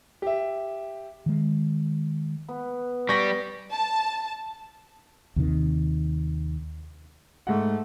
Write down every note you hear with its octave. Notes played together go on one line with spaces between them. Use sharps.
G4 E5
D#3 G#3
B3
G3 C#6 A#6 B6
A5
D#2 C3 D#3
G#2 A3 F#5